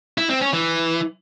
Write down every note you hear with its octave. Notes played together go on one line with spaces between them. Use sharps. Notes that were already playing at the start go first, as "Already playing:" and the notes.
E4
C4
C#4
E3